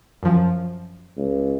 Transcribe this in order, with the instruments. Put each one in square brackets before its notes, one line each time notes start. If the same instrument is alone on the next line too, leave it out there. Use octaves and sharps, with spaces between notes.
[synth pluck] F#2 F3
[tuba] C#2